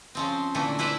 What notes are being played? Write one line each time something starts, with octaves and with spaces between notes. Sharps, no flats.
C#3 F3 C4
A#2 D3 E3 A3
E4 B4 C5 D5 E5